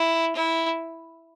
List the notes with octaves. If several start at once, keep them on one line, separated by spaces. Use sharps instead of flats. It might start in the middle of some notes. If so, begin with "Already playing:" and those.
Already playing: E4
E4